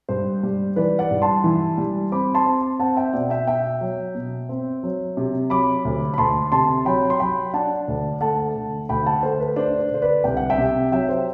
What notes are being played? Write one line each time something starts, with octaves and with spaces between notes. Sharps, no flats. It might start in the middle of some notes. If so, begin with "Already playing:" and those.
G2 C5
G3
E3 B4 D5
D5 F#5
G2
A5 C6
E3
G3
C4 B5 D6
A5 C6
C4
C4 F#5 A5
E5 G5
B2 D5 F#5
E5 G5
B2 E5 G5
F#3
B2
C4
F#3
C3
F#3 B5 D6
D2
B5
D2 A5 C6
C3 A5 C6
F#3 G5 B5
C6
F#3 G5 B5
D4 F#5 A5
D2
A3 F#5 A5
D3
D2 G5 B5
F#5 A5
A3 C5
B4
D4 C5
C5
D3 C5
B4 D5
C2 G5
F#5
E5 G5
C3
F#3 E5 G5
C5